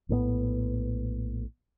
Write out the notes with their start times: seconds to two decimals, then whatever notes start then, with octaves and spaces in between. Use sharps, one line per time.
0.09 A#1 A2 F3 B3